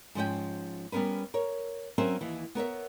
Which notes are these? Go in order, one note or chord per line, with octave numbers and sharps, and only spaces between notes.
G#2 F3 C#4 G5
G3 B3 C#4 A#4 B4
A#4 C#5
F#3 C4 C#4 A#4 C5 E5
D#2 E3
B3 A#4 C#5 E5